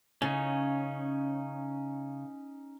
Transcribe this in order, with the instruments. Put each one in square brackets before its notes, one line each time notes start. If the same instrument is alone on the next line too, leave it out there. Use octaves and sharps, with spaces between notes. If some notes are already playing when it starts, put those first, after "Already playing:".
[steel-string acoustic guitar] C#3 [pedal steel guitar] C#4 D#4